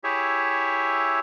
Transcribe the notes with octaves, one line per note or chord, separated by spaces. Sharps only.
E4 G4 G#4 C#5 E5